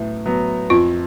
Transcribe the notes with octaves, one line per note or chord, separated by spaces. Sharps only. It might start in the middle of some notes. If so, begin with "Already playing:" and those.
Already playing: A2 F#3 B3
F#3 B3
F2 F4